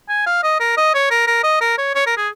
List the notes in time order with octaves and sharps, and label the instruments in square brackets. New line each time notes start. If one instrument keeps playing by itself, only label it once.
[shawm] G#5
F5
D#5
A#4
D#5
C#5
A#4
A#4
D#5
A#4
C#5
C#5
A#4
G#4